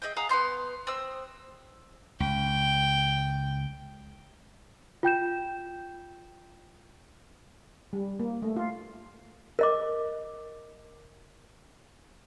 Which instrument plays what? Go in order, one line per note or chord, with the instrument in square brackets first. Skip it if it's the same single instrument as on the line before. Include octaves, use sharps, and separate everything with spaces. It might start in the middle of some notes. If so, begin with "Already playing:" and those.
[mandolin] G#4 D#5 E5 G5
G#4 F5 F#5 A#5
B3 C#4 C6 G6
C4 D#6 E6
[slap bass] C#2 [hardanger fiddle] G5
[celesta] F4 G5 G6 E7
[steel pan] G3
A#3
A3
F4
[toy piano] A#4 D#5 D6